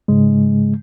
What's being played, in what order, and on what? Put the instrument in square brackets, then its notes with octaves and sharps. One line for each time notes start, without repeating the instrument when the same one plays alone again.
[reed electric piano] G#2 C#3 G#3